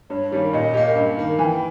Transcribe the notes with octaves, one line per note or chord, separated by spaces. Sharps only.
G2 C#5
D#3 G3 A#3 C#4
A#2 D#5
A#3 C#4 G4
G2
D#3 A#3
E3 G5 G#5